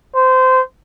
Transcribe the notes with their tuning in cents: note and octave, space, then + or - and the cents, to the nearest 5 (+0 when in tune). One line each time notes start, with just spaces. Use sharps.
C5 -20